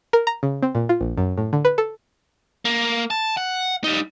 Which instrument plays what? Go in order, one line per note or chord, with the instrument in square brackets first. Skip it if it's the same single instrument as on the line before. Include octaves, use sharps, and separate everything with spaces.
[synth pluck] A#4
A#5
C#3
C4
A#2
F4
A#1
F#2
A2
D3
B4
A4
[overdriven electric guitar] A#3
A5
F#5
G3 D#4